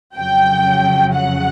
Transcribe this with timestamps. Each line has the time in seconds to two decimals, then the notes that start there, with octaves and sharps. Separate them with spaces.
0.16 F2 C#3 F#3 G5
1.13 F#5